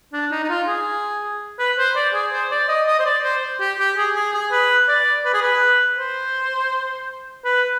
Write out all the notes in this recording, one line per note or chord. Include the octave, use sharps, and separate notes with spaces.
D4
D#4
D#4
F4
G#4
B4
C5
D5
G#4
C5
D5
D#5
D#5
C5
D5
C5
G4
G4
G#4
G#4
G#4
B4
D5
B4
G#4
B4
C5
B4